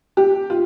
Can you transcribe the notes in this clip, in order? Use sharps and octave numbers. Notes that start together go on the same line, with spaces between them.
G4
F4